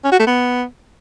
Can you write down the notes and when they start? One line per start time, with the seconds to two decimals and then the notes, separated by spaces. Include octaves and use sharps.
0.04 C#4
0.12 F#4
0.19 A3
0.27 B3